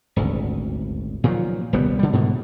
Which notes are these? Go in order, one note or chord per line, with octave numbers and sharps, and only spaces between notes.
D#1 G#1 D2
A#2 D#3 F3 F#3
D#1 C2 G3 B3
D3 G3
G#2 B2 D3 D#3